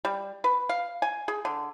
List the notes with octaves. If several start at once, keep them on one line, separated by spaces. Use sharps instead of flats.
G3
B4
F5
G#5
G#4
D3